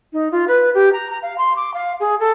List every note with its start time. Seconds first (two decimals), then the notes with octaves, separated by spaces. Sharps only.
0.13 D#4
0.32 F4
0.48 B4
0.74 G4
0.93 A#5
1.10 A#5
1.22 F5
1.38 C6
1.56 D6
1.74 F5
2.00 G#4
2.20 A4